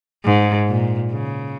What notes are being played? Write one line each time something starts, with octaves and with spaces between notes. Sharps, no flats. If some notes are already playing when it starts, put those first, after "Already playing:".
G#2
A#2
C#3